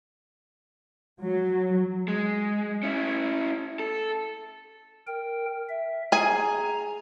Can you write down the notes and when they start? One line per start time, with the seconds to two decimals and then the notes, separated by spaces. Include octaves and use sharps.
1.22 F#3
2.08 G#3
2.83 C#4 E4
3.80 A4
5.07 A#4 G5
5.69 E5
6.12 G#4 G#5 A#5